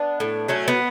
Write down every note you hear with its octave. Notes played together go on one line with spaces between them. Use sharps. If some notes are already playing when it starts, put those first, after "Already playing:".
Already playing: B3 D4
A2
F#3 A3 C#4
B3